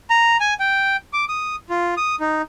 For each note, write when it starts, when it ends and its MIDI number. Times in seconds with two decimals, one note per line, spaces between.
0.10 0.37 82
0.40 0.54 80
0.60 0.96 79
1.13 1.25 86
1.29 1.56 87
1.70 1.95 65
1.97 2.16 87
2.20 2.42 63